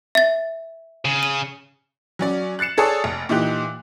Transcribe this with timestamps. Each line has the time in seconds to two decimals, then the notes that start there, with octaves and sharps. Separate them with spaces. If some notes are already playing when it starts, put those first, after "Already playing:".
0.15 E5 A6
1.05 C#3
1.23 D#7
2.19 F#3 C#4 D5
2.59 F#6 A6 C7 C#7 E7
2.78 G#4 A4 C#5 D5 A5 D#6
3.04 F1
3.29 A#2 E3 D#4 G4 F#6